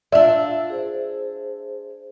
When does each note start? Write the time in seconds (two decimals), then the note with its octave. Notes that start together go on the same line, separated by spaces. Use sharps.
0.12 D4 F4 D5 E5 F5
0.70 G#4 C5